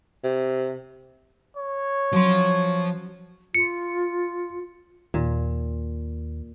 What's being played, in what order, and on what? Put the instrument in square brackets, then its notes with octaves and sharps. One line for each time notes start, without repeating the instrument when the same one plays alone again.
[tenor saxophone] C3
[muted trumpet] C#5
[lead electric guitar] F3 C6 [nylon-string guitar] F#3 C#4
[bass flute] F4 [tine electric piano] C#7
[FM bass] D#2 [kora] A#2